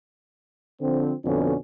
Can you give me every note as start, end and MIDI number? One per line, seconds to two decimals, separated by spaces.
0.81 1.13 50
0.81 1.13 53
0.81 1.13 60
1.25 1.55 41
1.25 1.55 47
1.25 1.55 50
1.25 1.55 61